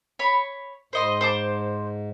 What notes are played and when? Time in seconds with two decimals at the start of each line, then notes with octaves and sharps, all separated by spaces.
0.19 C#5 B5
0.93 G#2 C5 D#5 C6
1.21 C5 A5 D6